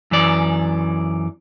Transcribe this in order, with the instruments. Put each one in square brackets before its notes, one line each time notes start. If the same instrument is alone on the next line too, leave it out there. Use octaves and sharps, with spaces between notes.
[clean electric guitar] F#2 E3 D5